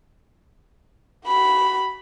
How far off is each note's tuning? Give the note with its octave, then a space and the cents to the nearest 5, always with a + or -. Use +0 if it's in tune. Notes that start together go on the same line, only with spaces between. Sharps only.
F#4 +40 B5 +0